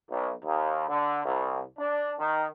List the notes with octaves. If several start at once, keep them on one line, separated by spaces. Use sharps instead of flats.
B1
D#2
D3
C2
D4
D#3